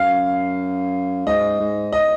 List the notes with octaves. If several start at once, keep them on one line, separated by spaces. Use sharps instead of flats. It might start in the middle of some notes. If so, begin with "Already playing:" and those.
Already playing: F#2 F5
G#2 D#5
G#2
D#5